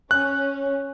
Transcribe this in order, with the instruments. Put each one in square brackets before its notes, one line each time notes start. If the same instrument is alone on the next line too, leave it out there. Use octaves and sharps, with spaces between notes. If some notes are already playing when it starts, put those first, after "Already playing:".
[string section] C#4 [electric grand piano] F#6